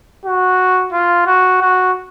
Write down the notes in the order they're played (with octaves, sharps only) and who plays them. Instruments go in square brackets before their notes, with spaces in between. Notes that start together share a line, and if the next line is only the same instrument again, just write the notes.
[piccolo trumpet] F#4
F4
F#4
F#4